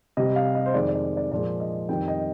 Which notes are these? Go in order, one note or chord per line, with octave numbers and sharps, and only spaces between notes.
C3 G3 D#5
F5
D#5
C5
F2 D#3 G#3 D5
D5
D5
A#2 F3 G#3 D5
D#5
F2 D#3 G3 G5
D#5